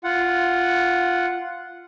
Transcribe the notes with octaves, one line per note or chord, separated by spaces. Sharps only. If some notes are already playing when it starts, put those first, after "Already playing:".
F4 F#5